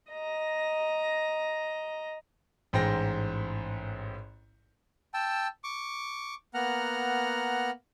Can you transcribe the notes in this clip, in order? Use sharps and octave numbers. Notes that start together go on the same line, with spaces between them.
D#5 A#5
A1 G#2 C5 G5 A#6
G5 A5 E6
C#6 D6
A#3 B3 F#5 A#5 F6